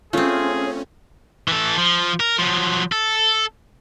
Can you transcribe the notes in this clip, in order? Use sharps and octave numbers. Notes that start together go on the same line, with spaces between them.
A3 C4 C#4 F4 G#4
E3 A4
F3
A#4
F3 F#3
A4